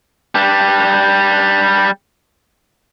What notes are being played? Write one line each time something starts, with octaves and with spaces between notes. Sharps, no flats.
G3 D4